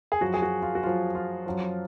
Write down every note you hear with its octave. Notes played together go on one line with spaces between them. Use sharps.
G#4
F#2 F3 F#4
G#4
F#4
F4
F#4
F#2 F3 F4
F4
F#2 F3